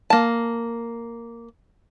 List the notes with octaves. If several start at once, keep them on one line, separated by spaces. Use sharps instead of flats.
A#3 A5